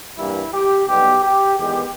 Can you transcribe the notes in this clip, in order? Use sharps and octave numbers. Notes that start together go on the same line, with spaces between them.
G2 E3 G3 A#3 E4
G4
B1 B2 G3 B3 G4
G4
E2 D#3 G#3 B3 G4